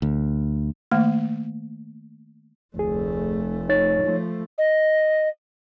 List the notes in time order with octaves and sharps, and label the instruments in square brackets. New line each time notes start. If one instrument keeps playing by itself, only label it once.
[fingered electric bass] D2
[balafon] D#3 A3 A#3
[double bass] F1 A3 [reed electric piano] D2 G#4
[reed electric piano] D#4 C#5 A6
[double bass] F3 A3
[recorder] D#5